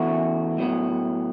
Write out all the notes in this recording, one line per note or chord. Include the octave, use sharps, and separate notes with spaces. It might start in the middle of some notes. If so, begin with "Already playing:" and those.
Already playing: E2 E3 A3 F#4
A2 F#3 B3